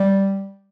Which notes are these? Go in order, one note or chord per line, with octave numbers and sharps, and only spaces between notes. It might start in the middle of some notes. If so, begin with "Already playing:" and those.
Already playing: G3